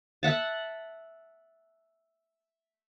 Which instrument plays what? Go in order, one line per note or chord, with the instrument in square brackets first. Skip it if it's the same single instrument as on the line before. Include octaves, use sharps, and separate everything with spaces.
[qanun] E5 F#5 A5